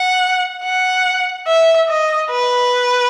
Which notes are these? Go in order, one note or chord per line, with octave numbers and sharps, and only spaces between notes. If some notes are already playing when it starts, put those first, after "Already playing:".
Already playing: F#5
F#5
E5
D#5
B4